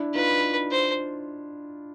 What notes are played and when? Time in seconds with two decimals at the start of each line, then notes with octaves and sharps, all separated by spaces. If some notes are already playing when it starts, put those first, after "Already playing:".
Already playing: D4 E4
0.14 D#4 F4 B4
0.72 C5